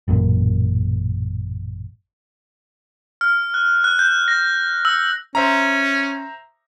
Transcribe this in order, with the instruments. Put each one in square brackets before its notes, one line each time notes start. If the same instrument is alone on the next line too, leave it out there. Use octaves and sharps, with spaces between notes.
[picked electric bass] A1 F#2 A#2
[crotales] F6
F#6
F#6
G6
A#6
E6
[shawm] C#4 [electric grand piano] C5 E5 A#5